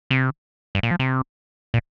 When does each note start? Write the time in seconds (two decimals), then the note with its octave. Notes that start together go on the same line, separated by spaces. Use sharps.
0.10 C3
0.75 G2
0.83 A#2
0.91 F3
0.99 C3
1.74 A#2